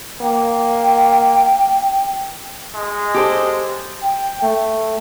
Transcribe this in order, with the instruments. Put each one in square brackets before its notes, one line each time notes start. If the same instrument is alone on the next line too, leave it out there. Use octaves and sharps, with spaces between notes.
[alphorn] A#3 [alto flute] G5
[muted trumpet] G#3
[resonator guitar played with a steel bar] G4 A4 C5
[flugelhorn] G5
A3